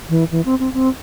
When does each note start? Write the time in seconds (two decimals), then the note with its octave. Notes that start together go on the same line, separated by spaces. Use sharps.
0.09 E3
0.31 E3
0.45 C4
0.59 C4
0.74 C4